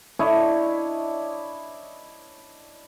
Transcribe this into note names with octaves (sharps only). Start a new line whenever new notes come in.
D4 E4 C#5 D#5